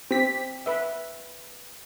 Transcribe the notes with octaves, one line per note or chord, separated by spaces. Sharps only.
C4 G4 B6
B4 E5